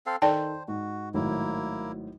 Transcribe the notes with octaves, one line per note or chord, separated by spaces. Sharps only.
C4 A4 F5
D#3 A4 C5 D5 G5 A5
G#2 F#4
G#1 A2 F#3 A#3 E4